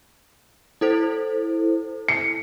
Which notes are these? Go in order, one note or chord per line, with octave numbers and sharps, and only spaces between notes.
E4 A4 C5
C#7